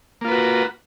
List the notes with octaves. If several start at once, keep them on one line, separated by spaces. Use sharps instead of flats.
A#3 F4 F#4 B4